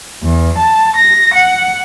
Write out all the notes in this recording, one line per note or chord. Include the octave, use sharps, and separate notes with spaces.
E2
A5
A#6
F#5